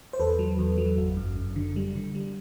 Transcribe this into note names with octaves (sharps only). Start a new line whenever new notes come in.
C5
E2 A4 B4
F#3
E2
F#3
G1
F#2
F#2
D3
G3
D3
G3